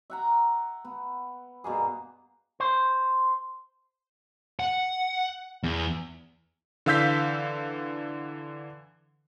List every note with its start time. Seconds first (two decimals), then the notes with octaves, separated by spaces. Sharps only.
0.10 E5 F#5 A#5
0.85 B3
1.64 G2 B2 A#3 G#4
2.60 C5
4.59 F#5
5.63 E2
6.86 D3 E3 F5 E6 G6 B6